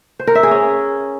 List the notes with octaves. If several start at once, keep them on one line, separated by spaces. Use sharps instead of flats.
C5
A#4
E5
G#4
C#4